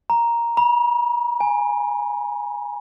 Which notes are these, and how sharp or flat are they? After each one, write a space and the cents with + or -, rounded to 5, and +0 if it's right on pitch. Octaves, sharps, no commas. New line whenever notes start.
A#5 +5
B5 -45
G#5 -5